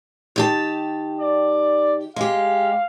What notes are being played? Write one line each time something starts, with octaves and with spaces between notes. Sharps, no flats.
D#3 G4 A5
D5
G#3 G4 F5